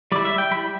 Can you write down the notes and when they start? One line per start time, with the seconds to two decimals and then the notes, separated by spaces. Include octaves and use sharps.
0.12 G3 E4 D5
0.25 E5
0.38 G5
0.51 G3 E4 B5